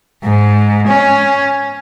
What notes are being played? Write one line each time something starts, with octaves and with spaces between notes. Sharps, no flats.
G#2
C#4